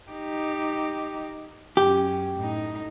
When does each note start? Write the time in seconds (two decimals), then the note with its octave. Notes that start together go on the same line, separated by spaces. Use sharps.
0.11 D#4 G4
1.77 F#2 C#4 G4
2.36 A2 D#4